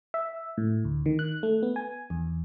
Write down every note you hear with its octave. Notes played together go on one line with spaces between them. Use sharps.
E5
A2
D2
D#3
F#6
A3
B3
G#5
E2